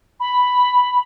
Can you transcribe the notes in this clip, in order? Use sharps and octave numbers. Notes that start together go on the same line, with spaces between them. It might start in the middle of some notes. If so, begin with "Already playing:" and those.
B5